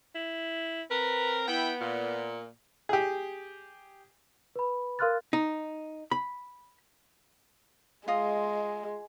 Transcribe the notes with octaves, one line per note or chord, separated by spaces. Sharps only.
E4
C4 A#4 B4
B3 E4 G5
A#2
G4 G#4
B4 B5
A#4 F5 C6 F6 F#6 A6
D#4
B5
G#3 F4 D#5